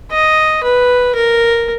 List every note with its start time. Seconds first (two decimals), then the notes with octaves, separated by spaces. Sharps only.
0.11 D#5
0.63 B4
1.15 A#4